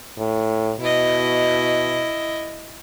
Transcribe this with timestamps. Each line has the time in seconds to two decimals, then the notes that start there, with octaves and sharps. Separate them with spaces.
0.18 A2
0.80 B2 E4 D#5